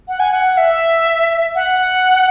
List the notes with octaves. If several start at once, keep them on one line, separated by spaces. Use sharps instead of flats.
F#5
G#5
F#5
E5
F#5